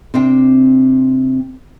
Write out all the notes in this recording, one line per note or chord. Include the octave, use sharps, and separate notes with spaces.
C3 C4 D4 G5